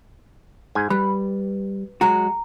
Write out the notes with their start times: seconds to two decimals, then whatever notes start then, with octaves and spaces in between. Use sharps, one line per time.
0.75 G#2 G#5
0.90 G3 B4
2.01 F#3 G#3 F#4 A#5